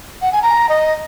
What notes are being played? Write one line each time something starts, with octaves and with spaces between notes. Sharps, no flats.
F#5
G#5
A#5
D#5